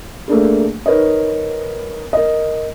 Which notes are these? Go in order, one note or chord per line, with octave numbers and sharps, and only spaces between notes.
A3 A#3 D4 G#4
D#4 A#4 B4 C#5 D#5
A#4 D#5